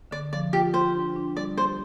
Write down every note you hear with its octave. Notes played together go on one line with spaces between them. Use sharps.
D3 D5
F3 D5
F4 G4
F4 C5
D4
D4
G3 D5
G4 C5